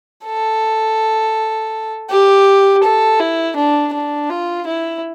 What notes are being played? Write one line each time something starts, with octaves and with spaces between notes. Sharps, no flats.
A4
G4
A4
E4
D4
D4
F4
E4